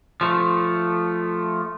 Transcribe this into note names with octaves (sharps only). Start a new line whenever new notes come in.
F3 A3